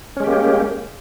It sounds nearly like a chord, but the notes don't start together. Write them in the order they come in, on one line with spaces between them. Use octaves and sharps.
C#4 G#3 G4 A#3